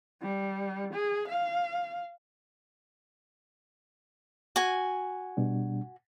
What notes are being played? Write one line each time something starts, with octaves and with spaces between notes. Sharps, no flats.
G3
G#4
F5
F#4 G#5
B2 G3 D4